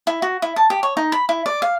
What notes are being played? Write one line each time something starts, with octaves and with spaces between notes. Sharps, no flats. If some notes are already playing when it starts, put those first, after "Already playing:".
E4
F#4
E4
A5
G4
C#5
D#4
B5
E4
D5
F5